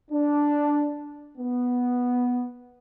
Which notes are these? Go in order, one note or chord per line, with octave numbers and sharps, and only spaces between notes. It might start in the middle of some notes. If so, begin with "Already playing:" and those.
D4
B3